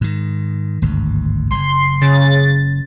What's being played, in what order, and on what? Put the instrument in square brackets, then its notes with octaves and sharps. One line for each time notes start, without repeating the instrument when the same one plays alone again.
[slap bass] G#2 D#3
G#1 D2 G2
[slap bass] F#1 [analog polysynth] C6
[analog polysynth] C#3 A6